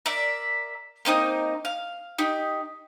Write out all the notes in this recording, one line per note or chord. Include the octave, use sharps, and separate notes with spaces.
A#4 D5 E5
A#3 C4 D#4 D#6
F5
D#4 G4